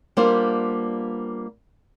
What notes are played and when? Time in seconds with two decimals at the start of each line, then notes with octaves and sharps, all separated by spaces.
0.17 G3 A#3 B3 D4 F4 C5